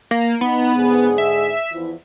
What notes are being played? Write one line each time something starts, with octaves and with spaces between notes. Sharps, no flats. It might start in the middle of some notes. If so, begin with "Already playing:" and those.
A#3
B3 D#4
G#2 D3 G#4
E5
E2 F3 E4